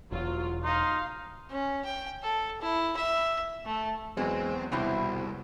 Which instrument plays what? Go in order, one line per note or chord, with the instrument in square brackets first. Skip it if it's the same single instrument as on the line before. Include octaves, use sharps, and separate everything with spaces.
[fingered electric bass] E1 [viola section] F#3 F4
[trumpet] D#4 [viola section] F5 [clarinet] C6
[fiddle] C#4
G5
A4
E4
E5
A3
[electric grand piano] E2 F#3 B3 [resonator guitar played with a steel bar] G#3 [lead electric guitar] C4
[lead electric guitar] C2 [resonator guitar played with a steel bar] B2 C4 E4